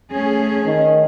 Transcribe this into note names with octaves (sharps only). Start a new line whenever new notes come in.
A3 C#4 G#4
D#3